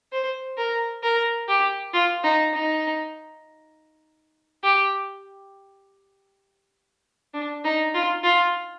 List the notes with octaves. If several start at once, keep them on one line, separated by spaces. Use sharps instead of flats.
C5
A#4
A#4
G4
F4
D#4
D#4
G4
D4
D#4
F4
F4